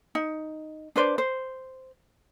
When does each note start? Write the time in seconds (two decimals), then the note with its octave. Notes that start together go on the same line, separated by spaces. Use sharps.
0.15 D#4
0.96 D4 B4 C5 D5
1.18 C5